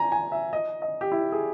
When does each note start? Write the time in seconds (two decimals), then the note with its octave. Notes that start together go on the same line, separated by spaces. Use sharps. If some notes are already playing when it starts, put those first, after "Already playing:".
Already playing: G#5 A#5
0.12 G#5
0.32 E5
0.53 D#5
0.82 D#5
1.01 G4
1.12 E4
1.32 G#4